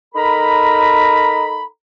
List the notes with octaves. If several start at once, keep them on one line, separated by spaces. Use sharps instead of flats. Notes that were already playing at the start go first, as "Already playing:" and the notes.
D#4 A4 A#4 A#5 B5